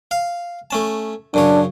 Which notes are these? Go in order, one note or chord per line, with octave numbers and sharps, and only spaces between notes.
F5
A3 C#4 A5
F#2 C#3 D4 C#5